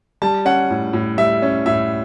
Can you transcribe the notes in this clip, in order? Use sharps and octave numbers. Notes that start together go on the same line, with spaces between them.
G3 A5
C#4 F#5
A2
A2
G3 E5
C#4
A2 E5